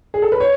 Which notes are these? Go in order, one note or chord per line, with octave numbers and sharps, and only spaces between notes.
G#4
A4
B4
C#5